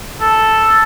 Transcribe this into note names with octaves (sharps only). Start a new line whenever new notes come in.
A4